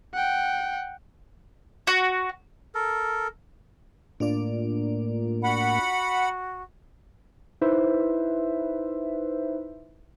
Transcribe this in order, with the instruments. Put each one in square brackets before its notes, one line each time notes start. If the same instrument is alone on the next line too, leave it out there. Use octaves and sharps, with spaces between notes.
[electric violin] F#5 G5
[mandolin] F#4
[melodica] A4 A#4
[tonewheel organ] A2 A#3 [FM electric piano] D4 F4 D5
[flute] F#4 [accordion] F#5 B5
[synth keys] D#4 E4 B4 C5 E5